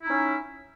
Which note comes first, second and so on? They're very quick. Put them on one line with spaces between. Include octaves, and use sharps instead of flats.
E4 D#4 C#4